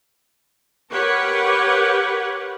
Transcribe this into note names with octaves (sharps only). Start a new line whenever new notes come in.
G4 A#4 B4 C#5 F#5